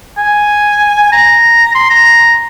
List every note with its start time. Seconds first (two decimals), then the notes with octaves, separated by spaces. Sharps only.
0.18 G#5
1.12 A#5
1.75 C6
1.90 A#5